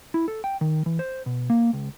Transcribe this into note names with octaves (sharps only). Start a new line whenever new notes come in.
E4
A4
G5
D#3
E3
C5
B2
A#3
C#2